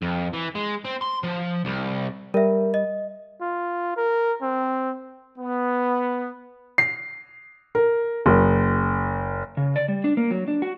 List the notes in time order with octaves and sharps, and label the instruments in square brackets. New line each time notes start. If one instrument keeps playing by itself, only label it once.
[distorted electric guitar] F2
E3
G#3
C4
C6
F3
C2
[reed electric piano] G3 [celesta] A#4 E5
[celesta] D#5
[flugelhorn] F4
A#4
C4
[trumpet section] B3
[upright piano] C7
A#4
F#1
[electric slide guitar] C#3
D5
G3
D4
A#3
F#3
D4
F#4